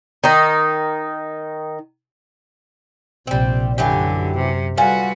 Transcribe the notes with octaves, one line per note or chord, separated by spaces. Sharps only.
D#3 D#4
A#1 C3 G3 C4
F#2 D3 E3 F#3 G4
C3
D3 G3 F4 F#4 B4 G#5